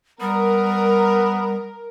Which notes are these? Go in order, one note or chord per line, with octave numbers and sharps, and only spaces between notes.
G3 B3 A#4